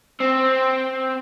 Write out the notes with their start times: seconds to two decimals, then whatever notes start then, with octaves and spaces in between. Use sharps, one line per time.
0.20 C4